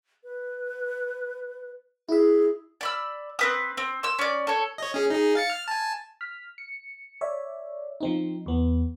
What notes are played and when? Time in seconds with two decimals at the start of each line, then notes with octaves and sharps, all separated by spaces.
0.24 B4
2.09 E4 G#4 E5
2.81 D5 B5 E6
3.39 C4 B4 D#6
3.77 C4
4.03 C6 E6
4.19 C#4 D5
4.47 A4 C#5
4.78 C#5 D#5
4.94 C#4 G#4
5.10 D#4 G#4
5.35 F5 A6 C#7
5.50 F6
5.68 G#5 A5
6.21 F6 B6
6.58 C#7
7.21 C#5 D5 E5
8.01 F3 C4 D#4
8.46 E2 B3